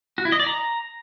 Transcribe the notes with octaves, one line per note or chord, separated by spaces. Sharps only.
F#4
E4
D#5
D5
A#5